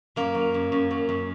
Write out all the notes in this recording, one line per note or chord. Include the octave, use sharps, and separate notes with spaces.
F#2 A#3
F#3
F#2
F#2
F#3
F#2